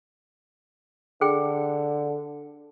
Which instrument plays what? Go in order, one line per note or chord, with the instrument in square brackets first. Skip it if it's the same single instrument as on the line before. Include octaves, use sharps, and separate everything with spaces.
[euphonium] D3 [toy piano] G#4 G5